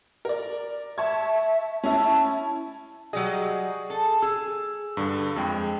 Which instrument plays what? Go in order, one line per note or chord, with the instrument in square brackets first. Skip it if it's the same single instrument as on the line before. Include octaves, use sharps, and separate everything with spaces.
[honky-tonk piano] A#4 D5
[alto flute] E5 [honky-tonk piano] A5 C#6 G#6
[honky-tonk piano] C#4 E4 [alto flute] A5
[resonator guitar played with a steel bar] F#3 G3 D#5 [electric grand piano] G#4
[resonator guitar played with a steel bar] A4
[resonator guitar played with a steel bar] G#4 [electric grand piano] E6
[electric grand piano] G2 D3
F2 G#3 G5